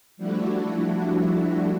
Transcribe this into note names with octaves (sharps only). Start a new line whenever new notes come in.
F3 G3 A3 D4 E4 F#4